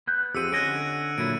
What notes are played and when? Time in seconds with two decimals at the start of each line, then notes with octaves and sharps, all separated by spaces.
0.08 B3 F#6 G6
0.35 F2 C4 G4 G#4 E6 C#7 D#7
0.52 D3 C#4 D#5 F#5 F#6 G#6 D7
1.18 A#2 F#3 E4 D7 D#7